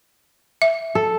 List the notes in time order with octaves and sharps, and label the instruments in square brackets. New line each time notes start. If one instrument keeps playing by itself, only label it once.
[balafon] E5
[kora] A4